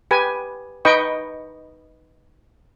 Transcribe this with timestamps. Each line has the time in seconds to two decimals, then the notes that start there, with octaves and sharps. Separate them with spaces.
0.11 G4 B4 G#5
0.85 D#4 B4 D#5 G5 C#6